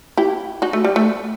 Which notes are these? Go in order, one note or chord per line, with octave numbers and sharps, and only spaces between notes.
E4 G4
D#4 F#4
A3
G3
A3